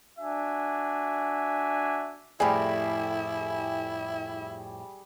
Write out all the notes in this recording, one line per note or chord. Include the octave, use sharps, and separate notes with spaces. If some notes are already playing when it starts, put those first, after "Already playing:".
D4 F#4 E5 G#5
F2 A2 G3 E4 G#4 G5 B5